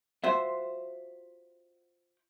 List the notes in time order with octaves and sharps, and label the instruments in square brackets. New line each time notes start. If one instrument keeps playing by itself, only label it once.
[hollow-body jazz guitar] F4 F#4 C5 E5